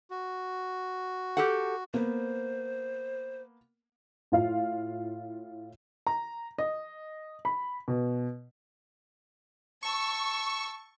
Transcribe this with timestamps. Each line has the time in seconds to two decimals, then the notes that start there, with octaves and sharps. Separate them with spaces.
0.10 F#4
1.37 G4 A4 F#5
1.94 A#3 B3 C5
4.32 A2 F4 F5
6.07 A#5
6.58 D#5
7.45 B5
7.88 B2
9.83 A5 C#6 E6